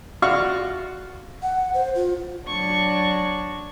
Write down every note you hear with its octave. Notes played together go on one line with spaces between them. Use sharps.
F4 F#4 D5 F5 C#6 F6
F#5
C5
F4
F#3 D4 C#6